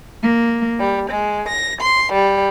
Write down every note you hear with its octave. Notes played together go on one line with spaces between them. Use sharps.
A#3
G3
G#3
A#6
C6
G3